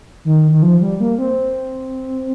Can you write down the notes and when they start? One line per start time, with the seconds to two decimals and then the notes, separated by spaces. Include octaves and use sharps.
0.25 D#3
0.51 D#3
0.62 F3
0.81 G3
1.00 A#3
1.18 C4